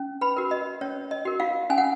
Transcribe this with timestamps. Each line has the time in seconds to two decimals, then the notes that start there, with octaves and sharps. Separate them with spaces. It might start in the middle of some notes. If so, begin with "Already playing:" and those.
Already playing: C#4
0.21 B4 B5
0.37 F#4 A#4
0.51 D#5
0.81 C#4 C#5
1.11 D#5
1.25 F#4 A#4
1.40 F4 F5
1.70 C#4 G#5
1.78 F#5